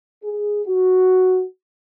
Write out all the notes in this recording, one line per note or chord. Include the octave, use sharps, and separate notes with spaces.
G#4
F#4